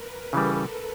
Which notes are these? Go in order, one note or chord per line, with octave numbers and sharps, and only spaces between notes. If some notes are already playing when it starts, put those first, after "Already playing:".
Already playing: A#4 B4
C#3 E3 G3 A4